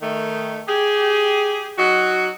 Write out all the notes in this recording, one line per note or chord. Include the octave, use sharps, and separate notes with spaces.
D#3 A3
G4 G#4
F#3 D#4 F#4